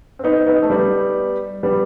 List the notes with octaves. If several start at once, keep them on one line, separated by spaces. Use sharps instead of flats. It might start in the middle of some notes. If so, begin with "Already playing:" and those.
C4
B3 D#4
B3 D#4
A3
G3 B3
G3 B3